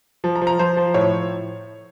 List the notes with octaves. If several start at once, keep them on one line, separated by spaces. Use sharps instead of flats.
F3
A#5
F3
A#5
F3 C5
F3
A2 C#5